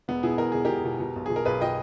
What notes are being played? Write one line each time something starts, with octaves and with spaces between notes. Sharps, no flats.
E1 B3
B2 E4 G#4
E2 A#4
E1 G#4
E1 G4 A#4
B2
B2
B1
B2 G#4
A#4
B1 G#4 B4
B2 D#5 G5